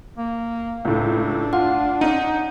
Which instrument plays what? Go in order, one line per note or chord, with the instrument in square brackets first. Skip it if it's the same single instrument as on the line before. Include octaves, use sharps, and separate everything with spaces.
[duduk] A#3
[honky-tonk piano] C#2 A2 [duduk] D4
[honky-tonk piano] F4 [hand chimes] F#5
[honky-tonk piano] C#4 D#7 [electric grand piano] D#4